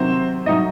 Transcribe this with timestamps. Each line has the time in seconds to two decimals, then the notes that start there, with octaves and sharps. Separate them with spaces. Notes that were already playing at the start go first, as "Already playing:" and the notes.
Already playing: C3 D#3 F#3 C4 C5
0.46 A2 F#3 D#4 D#5